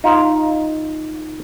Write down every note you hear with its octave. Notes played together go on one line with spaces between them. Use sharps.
D#4 F4 F5